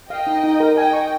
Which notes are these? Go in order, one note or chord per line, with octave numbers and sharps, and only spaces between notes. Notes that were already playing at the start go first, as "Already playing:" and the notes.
D#5 F5 G5
D#4
D#4
A#4
D#5 G5 G#5
C#6